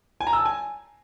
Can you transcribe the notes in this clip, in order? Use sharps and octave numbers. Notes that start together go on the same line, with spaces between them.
G#5
A#5
E6
A5
G#5